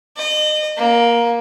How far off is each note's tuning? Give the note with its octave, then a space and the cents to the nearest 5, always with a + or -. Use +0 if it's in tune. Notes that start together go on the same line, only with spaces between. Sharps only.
D#5 -30
A#3 +15